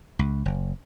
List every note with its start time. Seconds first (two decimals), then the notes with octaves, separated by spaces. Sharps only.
0.19 C#2
0.45 F#1